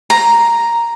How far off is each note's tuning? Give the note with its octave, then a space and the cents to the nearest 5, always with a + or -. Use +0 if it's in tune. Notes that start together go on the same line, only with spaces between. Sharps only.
A#5 +0